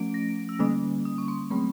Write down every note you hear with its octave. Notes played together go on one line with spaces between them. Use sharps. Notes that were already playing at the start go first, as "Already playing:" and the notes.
Already playing: F3 A3 C#4 D7
A#6
E6
D3 G3 A#3 C#4 D#6
D#6
C#6
C6
F#3 A3 C4 B5